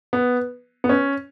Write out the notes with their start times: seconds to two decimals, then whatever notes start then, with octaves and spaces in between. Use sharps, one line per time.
0.13 B3
0.84 B3
0.89 C#4